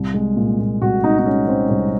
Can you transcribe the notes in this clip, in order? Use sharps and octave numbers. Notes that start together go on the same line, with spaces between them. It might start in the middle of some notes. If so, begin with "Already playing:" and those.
Already playing: C2
G#3
A#2
A#2
C2 F#4
G#3 D#4
D#4
G#3 C#4
G#3 C4
C2 C4